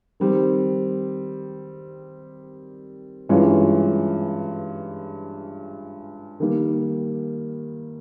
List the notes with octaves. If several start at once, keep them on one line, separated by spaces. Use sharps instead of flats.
D#3 G3 C4
G2 E3 G#3 C#4 F4
D#3 G3 A#3